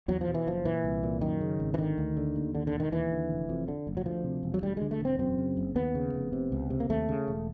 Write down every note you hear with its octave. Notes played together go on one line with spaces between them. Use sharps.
E2 F#3
F3
B2
E3
F#1 F3
A#2 E3
C2
A#2
F#2 D#3
C#3
G#1
E3
D3 D#3
D2
D3
D#2
D3
D3
E1
D#3
D#2 E3
D3
F1
F2
D3
F#1
F#3
D2 F3
C3
E1
F#3
D2 G3
D3 G#3
A3
E1 C4
F#2 C4
C#3
F#1
D#2 B3
C#3
F1
C3
C#2
C3
A#3
D#2 A3
C#3
E1